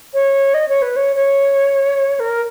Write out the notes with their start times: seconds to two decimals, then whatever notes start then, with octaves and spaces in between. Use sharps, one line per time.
0.14 C#5
0.54 D#5
0.69 C#5
0.82 B4
0.96 C#5
1.16 C#5
2.20 A#4